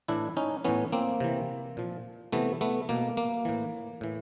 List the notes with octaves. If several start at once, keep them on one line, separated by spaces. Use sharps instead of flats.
A2 E3 D4 E4
C#4 D#4
A2 E3 B3 C#4
A#3 C4
C3 E3
A#2 F3
C3 E3 A3 B3
A3 B3
B2 A#3
A#3
A2 E3
A2 E3